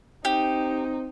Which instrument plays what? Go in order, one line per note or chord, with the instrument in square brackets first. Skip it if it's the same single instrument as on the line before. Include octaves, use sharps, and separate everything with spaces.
[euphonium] C4 [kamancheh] D#4 [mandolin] G4